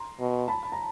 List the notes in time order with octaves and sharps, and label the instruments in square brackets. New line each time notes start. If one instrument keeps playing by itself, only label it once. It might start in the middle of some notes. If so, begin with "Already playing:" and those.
Already playing: [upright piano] A#5 C6
[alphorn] B2
[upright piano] A5 B5
B5
A#5